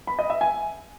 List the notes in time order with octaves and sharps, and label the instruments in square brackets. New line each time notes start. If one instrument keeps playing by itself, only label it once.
[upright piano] B5
D#5
E5
G#5